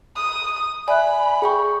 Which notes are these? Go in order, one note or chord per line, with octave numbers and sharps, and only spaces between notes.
D#6
D5 E5 G#5 B5 F#6
G#4 G5 C#6